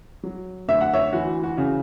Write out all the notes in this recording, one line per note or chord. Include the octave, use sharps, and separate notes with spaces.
F#3
D2 E5
F#5
C#5 E5
E3 F#4
F#4
C#3